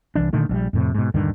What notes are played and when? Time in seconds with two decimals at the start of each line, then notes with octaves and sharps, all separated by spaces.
0.15 C2 E3 D4
0.33 A#2 D3 D#3 A3
0.49 A#1 E3 G3
0.73 F2 A2 C3
0.94 G#2 B2
1.14 D#1 G2 D3 D#3